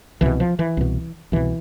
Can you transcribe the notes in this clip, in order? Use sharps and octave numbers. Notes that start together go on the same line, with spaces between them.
C2 B2 E3
F3
E3
C2 B2
C2 B2 E3